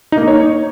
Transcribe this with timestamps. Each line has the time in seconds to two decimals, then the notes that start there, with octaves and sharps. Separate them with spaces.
0.12 D#4
0.17 A#3
0.23 D#4
0.28 C#5